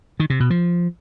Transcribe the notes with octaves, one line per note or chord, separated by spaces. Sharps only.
D#3
C3
B2
F3